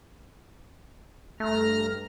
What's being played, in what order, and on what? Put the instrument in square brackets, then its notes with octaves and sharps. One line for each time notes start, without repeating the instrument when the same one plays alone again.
[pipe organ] G2 A#5 F6 [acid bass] A3